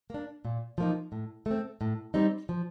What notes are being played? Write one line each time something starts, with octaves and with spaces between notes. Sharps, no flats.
A#3 D4
A#2
F3 A#3 D#4
A2
A3 C4
A2
G3 C4 D#4
F3